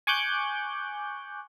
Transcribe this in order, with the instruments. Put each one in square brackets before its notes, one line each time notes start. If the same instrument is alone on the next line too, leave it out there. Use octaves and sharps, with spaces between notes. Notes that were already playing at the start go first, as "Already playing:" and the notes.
[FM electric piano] G#5 C#6 D6 F#6 G6